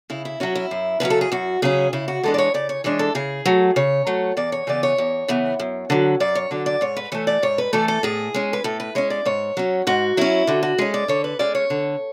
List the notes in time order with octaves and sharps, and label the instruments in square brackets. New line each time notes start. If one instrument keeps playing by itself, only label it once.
[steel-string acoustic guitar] C#3 E4
E4
F#3 C#4 F#4
E4
F#2
C#3 F#3 C#4 B4
A4
G#4
F#2 F#4
C#3 F#3 C#4 G#4
C#3 E4
F#4
E3 G#3 D4 A4
D5
C#5
C#3 D5
C#5
E3 G#3 D4 C#5
A4
C#3 G#4
F#3 A3
C#3 C#5
F#3 A3
E2 D5
C#5
C#3 E3 B3 D5
C#5
E2
C#3 E3 B3
F#2
D3 F#3
F#2 D5
C#5
D3 F#3 D5
D5
G#2 C#5
B4
E3 A3 C#5
D5
G#2 C#5
B4
E3 A3 A4
A4
A2 G#4
G#3 C#4
B4
A2 A4
B4
G#3 C#4 C#5
D5
G#2 C#5
F#3 C#4
G#2 F#4
F#3 C#4 E4
D3 F#4
F#4
G#3 C#4 G#4
D5
D3 C#5
B4
G#3 C#4 D5
C#5
D3